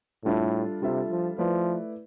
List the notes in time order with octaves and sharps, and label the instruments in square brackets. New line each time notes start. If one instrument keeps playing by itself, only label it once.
[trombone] A2 [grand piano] G3 D4 F4 A4 E5
[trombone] C3 [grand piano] G3 D4 F4 A4 E5
[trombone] F3
[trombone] F3 [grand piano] A3 E4 B4 D5